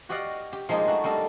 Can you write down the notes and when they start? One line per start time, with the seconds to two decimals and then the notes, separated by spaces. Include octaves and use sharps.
0.09 F#4 G4 D5 D#5 F5 F#5
0.53 G4
0.69 F3 G#3 A#3 D#4 G4 G#4
0.88 A3 F#4
1.04 G3 A#3 D#4 A4